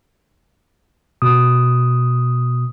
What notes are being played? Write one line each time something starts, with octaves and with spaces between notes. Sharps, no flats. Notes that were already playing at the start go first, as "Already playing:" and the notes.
B2 D#6